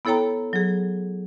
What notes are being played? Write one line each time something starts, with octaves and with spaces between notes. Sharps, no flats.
B3 E4 A4 C#5 G5 A#5
F#3 G#4